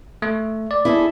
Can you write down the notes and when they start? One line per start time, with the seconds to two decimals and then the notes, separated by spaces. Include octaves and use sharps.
0.22 A3
0.71 D5
0.85 E4 G#4 A4